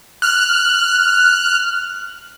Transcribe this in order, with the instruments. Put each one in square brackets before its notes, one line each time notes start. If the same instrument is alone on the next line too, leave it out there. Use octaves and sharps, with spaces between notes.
[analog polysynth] F6 F#6